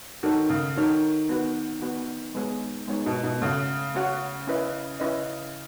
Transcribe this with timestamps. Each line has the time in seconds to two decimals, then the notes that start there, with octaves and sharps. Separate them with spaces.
0.23 D#3 F#4 A4 C#5
0.49 C#3
0.76 D#3 F#4 A4 C#5
1.29 B3 F#4 B4
1.82 B3 F#4 B4
2.35 G#3 B3 D#4 G#4 C#5
2.88 G#3 B3 D#4 G#4 C#5
3.06 B2
3.23 B2
3.41 C#3 A3 C#4 F#4 C#5 F#5
3.94 A3 C#4 F#4 C#5 F#5
4.47 C#4 E4 B4 D#5
5.00 C#4 E4 B4 D#5